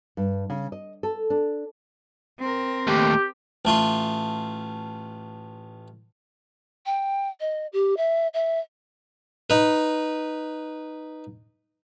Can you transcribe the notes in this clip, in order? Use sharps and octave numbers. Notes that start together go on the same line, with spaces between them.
G2
C#3
D#5
A4
D4
C4 A#4
D#2 A2 G4
A1 A3 F4 C6
G5
D#5
G4
E5
E5
D#4 B4